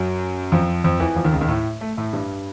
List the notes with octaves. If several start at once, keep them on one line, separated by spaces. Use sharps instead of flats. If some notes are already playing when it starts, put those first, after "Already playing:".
Already playing: F#2 F#3
F2 F3
F2 F3
E2 E3
F2 F3
D#2 D#3
C#2 C#3
D#2 D#3
A2 A3
A3
A2 A3
G2 G3